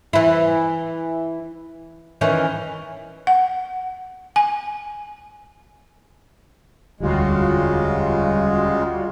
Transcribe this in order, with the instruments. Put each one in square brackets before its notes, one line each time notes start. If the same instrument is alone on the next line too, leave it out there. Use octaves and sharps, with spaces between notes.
[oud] E3 E4
D#3 E3 C#4
[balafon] F#5
G#5
[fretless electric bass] E1 D2 [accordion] C#3 G#3 [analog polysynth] G3 F4 F#4